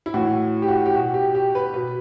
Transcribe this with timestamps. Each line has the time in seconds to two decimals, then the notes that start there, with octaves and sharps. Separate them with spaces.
0.06 E4
0.14 A2 E3 F#4
0.62 G4
0.68 F#4
0.86 G4
0.94 B2 F#4
1.14 G4
1.35 G4
1.55 B4
1.74 B2 B4